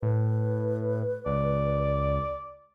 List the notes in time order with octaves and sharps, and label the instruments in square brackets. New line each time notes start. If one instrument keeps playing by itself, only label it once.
[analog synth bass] A2 [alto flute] B4
[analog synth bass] C#2 [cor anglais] D5